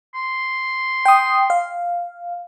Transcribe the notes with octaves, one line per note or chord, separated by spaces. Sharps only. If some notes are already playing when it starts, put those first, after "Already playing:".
C6
G5 D#6
F5